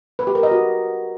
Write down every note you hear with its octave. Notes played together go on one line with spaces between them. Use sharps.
B4
G4
A#4
D#5
F#4